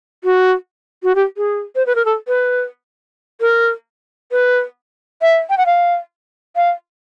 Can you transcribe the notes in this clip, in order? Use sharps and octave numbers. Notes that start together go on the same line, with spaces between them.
F#4
F#4
G4
G#4
C5
B4
A#4
A4
B4
A#4
B4
E5
G5
F#5
F5
F5